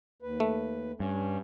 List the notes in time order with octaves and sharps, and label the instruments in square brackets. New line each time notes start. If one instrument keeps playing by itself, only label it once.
[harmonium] D#2 B4
[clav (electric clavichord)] A3
[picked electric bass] G2 [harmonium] C#4